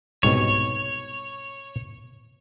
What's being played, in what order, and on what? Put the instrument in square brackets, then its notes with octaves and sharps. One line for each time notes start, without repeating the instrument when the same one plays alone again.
[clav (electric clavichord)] C2 G#2 B2 [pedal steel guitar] C#5